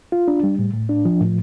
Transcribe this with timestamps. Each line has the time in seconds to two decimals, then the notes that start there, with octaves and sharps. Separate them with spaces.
0.12 F4
0.28 D4
0.43 G3
0.59 A2
0.74 A2
0.89 D4
1.05 F3
1.21 A2